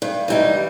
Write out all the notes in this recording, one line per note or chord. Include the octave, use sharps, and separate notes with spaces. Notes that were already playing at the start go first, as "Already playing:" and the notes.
G2
E3 G3 D#4